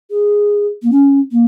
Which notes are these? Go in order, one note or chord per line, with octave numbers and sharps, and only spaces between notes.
G#4
A#3
C#4
A#3